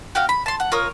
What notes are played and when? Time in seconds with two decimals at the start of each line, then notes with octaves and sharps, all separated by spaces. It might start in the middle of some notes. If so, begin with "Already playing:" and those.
0.15 F#4 G4 F5 A#5
0.29 B5
0.46 A5 C6
0.60 F#5
0.72 F4 A#4 C#5 D#6